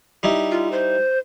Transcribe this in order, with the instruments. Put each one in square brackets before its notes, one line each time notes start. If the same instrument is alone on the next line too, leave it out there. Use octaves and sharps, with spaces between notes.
[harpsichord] G3 D#4 E4
[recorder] F4
C5